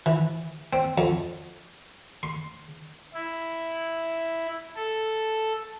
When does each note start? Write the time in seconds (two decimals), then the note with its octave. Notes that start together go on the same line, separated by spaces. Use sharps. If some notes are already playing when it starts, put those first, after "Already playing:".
0.06 E3
0.73 C4
0.98 F2
2.23 C6
3.14 E4
4.76 A4